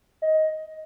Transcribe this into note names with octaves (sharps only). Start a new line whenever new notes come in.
D#5